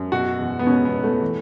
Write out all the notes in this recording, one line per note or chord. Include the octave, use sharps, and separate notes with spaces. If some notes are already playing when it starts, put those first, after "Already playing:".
Already playing: F#2
B2 F#4
E2
B3
B2 C#4
B3
E2
A3
E3